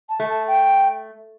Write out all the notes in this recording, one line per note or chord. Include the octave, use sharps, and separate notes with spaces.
A5
A3
A5
G5